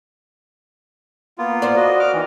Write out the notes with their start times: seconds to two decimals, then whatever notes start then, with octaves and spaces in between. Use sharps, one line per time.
1.38 A#3 B3 F4
1.62 A#4 C5 D5
1.76 F#4 D#5
2.00 D6 F6
2.12 D#3 E3